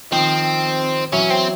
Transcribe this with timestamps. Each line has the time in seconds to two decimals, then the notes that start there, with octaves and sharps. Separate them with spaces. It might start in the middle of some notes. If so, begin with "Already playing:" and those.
0.11 D#3 F3 C4
1.12 E3 F#3 C#4
1.30 C4